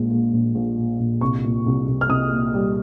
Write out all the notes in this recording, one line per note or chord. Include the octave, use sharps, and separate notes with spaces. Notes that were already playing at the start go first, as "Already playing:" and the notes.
Already playing: A#1 A#2 G#3
A#2
A#1
A#1
A#2
A#1
C2 C#6
A#2
C2
C2
F6
C2 D#6
A#2
G3